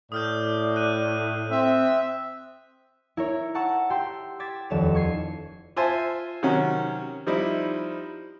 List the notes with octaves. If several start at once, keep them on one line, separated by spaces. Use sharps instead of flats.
A2 D5 D#6 F6 G6
F#6 D#7
C4 E5
E4 A#4 C#5
F#5 A5 A#5 C#6 E6
G4 G5 C6 E6
D6 G#6 A6 B6 E7
D#1 F2 C#5 E7
C#6 G#6 C7 D#7 E7
F4 C5 E5 G#5 A5
C3 D#3 F#3 C#4 F#4
F3 G3 C4 D#4 E4